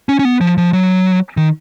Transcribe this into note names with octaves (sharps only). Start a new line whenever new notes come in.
C#4
C#4
B3
F3
F3
F#3
D#3